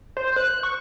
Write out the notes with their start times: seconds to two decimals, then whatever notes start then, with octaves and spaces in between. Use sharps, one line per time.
0.17 C5
0.36 F#6
0.63 C#6